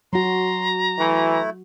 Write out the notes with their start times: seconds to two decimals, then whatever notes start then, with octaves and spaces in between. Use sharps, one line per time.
0.13 F#3 F#4 A#5 C6
0.99 E3 A3 E4